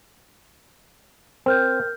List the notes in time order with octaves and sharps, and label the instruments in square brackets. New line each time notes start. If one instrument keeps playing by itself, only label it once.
[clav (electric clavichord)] C4 [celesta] A#4 F6 G6